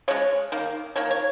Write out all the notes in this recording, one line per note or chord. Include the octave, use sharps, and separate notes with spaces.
C#3 G#3 C#5
D#3 A#3
D#3 A#3 C#5
C#5